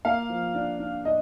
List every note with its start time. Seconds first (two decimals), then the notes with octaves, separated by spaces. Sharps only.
0.05 A#3 F5
0.30 F3
0.55 D4
0.79 D4
1.05 D4 D#5